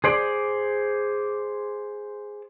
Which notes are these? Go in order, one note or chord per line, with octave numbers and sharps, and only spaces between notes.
G#4 C5 D5